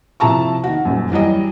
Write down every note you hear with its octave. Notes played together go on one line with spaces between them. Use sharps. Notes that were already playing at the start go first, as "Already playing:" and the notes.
C3 F3 E4 A5 A#5 C#6
D#3 F#4
D#1 F#2
E3 F#3 G3 D#5